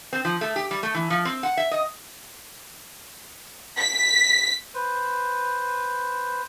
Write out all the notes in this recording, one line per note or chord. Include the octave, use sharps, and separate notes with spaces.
C4
F3
A3
G4
G3
A3
E3
F3
C4
F#5
E5
D#5
B6
B4 C5